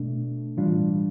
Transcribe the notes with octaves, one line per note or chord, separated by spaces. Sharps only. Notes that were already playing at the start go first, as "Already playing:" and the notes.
Already playing: B2 A3 D4
A2 E3 G3 D4 F4